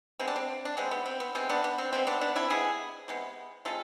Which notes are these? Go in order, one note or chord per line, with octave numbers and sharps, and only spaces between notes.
C3 G#3 B3 C4
D4
C4
D4
C3 G#3 B3 C4
B3
C4
B3
C3 G#3 B3 C4
B3 D4
B3
C4
C3 G#3 B3 C4
B3 D4
B3 D4
C4 E4
C3 G#3 B3 E4 G#4
C3 G#3 B3
C3 G#3 F4 A4